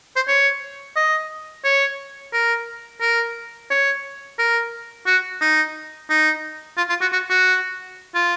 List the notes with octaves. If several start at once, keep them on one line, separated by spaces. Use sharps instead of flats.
C5
C#5
D#5
C#5
A#4
A#4
C#5
A#4
F#4
D#4
D#4
F4
F4
F#4
F#4
F#4
F4